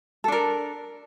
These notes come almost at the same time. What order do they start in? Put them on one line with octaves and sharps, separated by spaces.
A4 D4 A#4